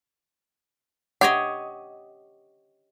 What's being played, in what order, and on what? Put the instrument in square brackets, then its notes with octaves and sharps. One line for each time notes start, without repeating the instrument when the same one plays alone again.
[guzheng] G4 C#5 D#5 [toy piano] F#5